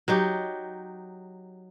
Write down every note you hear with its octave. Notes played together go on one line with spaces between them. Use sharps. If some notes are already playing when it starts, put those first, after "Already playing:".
F#3 D#4 G4